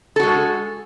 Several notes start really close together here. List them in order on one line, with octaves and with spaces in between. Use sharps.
A4 F#4 G#3